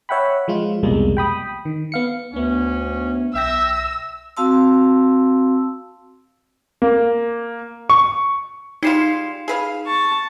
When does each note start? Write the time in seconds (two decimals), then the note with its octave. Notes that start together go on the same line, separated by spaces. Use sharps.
0.09 C#5 E5 F#5 G5 B5
0.48 F3 G#3 F4
0.83 C2 F2 B2 G3 G#3 A#3
1.17 G5 B5 D#6
1.65 D#3
1.92 B3 F5 C#7
2.34 D2 B3 C#4 D4
3.34 B1 E5 G5 E6 A#6
4.37 C4 F#4 F5 A5 C6 E6
6.82 A#3
7.90 C#6
8.83 G3 G#3 D#4 F4 C7 E7
9.48 G#4 B4 F5
9.87 A5 C#6